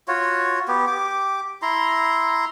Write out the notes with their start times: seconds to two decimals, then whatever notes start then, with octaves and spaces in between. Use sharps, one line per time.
0.08 F4 F#4 C#5
0.68 B3 G4
0.87 G4 D6
1.62 E4 A#5 C6